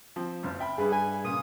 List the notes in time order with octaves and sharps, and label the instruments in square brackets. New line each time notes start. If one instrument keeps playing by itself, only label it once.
[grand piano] F3 C4
F#1 C#2
E5 G5 B5
[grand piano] G2 G3 B4 [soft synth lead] G#4
[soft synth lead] G#5
[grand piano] A#2 C#3 [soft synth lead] D#6